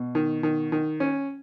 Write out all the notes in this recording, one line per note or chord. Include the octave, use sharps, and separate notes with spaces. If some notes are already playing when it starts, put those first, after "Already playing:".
Already playing: B2
D#3
D#3
D#3
C#4